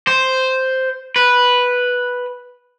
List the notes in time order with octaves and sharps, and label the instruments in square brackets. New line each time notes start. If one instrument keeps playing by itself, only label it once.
[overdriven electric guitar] C5
B4